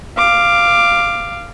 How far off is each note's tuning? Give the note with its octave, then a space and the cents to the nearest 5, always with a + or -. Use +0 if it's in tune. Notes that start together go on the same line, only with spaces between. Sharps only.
F5 -10 D6 +10